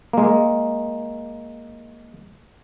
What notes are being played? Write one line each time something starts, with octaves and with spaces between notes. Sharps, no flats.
G#3 A#3